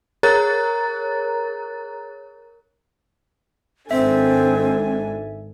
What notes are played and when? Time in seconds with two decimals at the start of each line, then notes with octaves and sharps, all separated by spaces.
0.23 G#4 A#4 C#5 A#5 F#6 A6
3.91 G#1 G#2 C4 D4 A4 E5 G#5